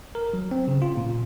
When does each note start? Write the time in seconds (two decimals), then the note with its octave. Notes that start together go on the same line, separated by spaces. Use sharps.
0.15 A#4
0.33 F#3
0.51 C4
0.68 C#3
0.82 F4
0.97 A#2